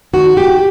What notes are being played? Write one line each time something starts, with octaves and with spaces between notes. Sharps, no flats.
D#3 F#4
G4